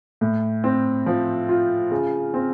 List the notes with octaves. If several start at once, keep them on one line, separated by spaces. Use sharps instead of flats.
A2
C4
F3
F4
C#3
C4